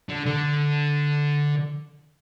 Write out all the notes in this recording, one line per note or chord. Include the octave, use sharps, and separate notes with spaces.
D3
D3